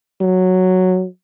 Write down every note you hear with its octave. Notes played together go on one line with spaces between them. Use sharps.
F#3